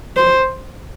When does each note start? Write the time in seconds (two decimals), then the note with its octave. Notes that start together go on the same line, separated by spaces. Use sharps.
0.16 C5